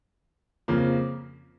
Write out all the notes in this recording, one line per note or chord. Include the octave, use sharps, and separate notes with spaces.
F2 C#3 F3 A#3